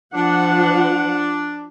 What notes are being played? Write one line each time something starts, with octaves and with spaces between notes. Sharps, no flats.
F3 D4 F#5